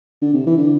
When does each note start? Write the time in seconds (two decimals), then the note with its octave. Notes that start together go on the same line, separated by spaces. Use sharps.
0.22 D3
0.34 C3
0.47 E3
0.58 D3